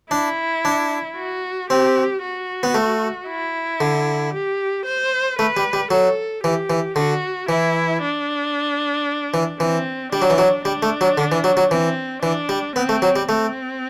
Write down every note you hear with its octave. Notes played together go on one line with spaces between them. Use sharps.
D4 E4
D4
F#4
C4 G4
F#4
B3
A3
E4
D3
G4
C5
A3 B4
G3
G3
F#3 A4
E3 G4
E3
D3 F#4
E3 E4
D4
E3
E3 C4
G3 D4
F#3
E3
F#3
G3 D4
A3
F#3
D3
E3
F#3
F#3
E3 C4
E3 D4
G3
B3 C4
A3
F#3
G3
A3 C4